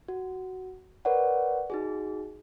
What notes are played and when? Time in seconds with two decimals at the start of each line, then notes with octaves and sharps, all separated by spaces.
0.08 F#4
1.05 A#4 B4 C#5 D5 F#5
1.70 D#4 F#4 G#4